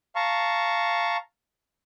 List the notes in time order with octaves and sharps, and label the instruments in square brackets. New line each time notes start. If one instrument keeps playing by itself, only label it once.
[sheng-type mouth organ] F5 A5 A#5 C#6